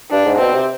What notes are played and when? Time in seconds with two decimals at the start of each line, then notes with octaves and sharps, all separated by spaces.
0.11 G2 D4
0.26 G#2
0.38 B2 C4
0.54 C3